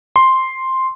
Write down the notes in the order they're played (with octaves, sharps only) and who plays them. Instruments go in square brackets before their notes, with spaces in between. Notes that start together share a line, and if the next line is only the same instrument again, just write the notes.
[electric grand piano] C6